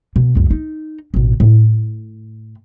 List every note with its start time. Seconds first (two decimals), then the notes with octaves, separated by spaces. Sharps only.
0.16 B2
0.35 C#2 F#2
0.51 D#4
1.14 A1 B2
1.40 A2